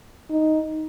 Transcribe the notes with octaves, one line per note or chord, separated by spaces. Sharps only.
D#4